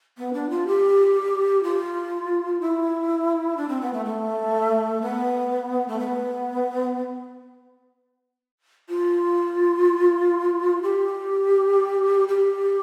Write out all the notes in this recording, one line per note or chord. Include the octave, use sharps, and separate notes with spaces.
B3
D4
F4
G4
F4
E4
D4
C4
B3
A3
A3
B3
A3
B3
F4
G4
G4